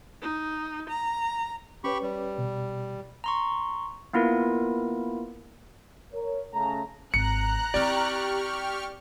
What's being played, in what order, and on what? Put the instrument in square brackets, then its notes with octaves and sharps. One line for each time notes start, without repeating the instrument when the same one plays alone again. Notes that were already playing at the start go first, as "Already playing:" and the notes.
[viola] D#4
A#5
[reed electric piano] C#4 B4 C#5 [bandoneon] G4 B5 C#6
[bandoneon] G3
[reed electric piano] B2
[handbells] A#5 C6 C#6
A#3 B3 E4 F4 A#4
[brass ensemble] A#4 C#5
C#3 A3 C#4 A5 A#5
[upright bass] G#1 [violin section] A#5 F#6 [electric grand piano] C#7
[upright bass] C4 E4 [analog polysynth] G4 C#6 F6 [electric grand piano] D5